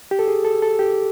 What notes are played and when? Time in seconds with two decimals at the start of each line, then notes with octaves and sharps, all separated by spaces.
0.11 G4
0.19 A4
0.28 G#4
0.45 A4
0.62 A4
0.79 G4